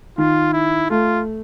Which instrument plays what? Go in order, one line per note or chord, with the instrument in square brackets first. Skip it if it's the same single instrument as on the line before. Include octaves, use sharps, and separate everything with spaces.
[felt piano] D#3 [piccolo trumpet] F4
[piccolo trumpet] E4
[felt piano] A3 [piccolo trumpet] F4